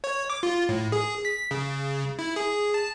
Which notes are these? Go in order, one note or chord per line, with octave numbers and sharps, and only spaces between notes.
C#5
D6
F4
A2
G#4
B6
C#3
E4
G#4
A5